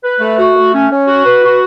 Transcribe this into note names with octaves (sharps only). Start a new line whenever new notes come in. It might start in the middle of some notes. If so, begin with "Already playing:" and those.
B4
A3
F#4
A3
C#4
C#4
F#4
B4
F#4